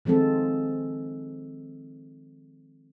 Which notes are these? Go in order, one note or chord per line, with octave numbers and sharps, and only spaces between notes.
D#3 F3 G#3 C4 A4